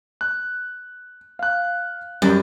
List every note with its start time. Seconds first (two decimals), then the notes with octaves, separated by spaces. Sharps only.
0.21 F#6
1.39 F5 F#6
2.22 F#2 G3